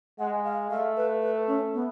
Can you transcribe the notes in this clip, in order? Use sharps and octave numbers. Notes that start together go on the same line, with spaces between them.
G#3 F#5
F5
A3 F5
B4
B4
C#4
B3